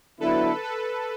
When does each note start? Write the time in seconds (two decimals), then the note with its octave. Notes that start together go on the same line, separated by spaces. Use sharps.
0.20 D3 F#3 B3 E4 A4 B4
0.63 A4 B4